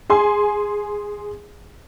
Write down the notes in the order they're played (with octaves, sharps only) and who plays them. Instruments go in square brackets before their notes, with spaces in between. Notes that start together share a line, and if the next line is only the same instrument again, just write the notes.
[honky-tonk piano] G#4 G#5 C6